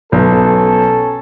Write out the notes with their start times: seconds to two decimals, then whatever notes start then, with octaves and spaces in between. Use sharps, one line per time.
0.12 B1 C#4 A4